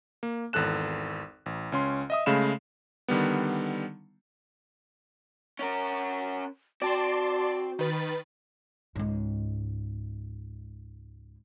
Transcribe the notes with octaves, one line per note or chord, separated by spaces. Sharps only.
A#3
G#1 E2 A4 F#6 E7
A1
C#2 C#4 C6
D#5 E5 D#6
C#3 G#3 A3 F5 B5 E7
D3 D#3 G3 B3
C#4 A#4
C4 F#4 D5 A5 C6
D#3 B4 A6
C#2 G#2